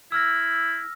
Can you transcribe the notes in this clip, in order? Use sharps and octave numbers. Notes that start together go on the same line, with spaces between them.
E4 E6 F6 A#6